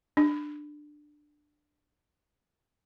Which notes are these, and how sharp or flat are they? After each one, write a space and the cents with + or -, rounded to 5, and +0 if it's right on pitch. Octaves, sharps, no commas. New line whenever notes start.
D4 +15